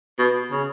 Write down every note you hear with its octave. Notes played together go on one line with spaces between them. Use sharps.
B2
C#3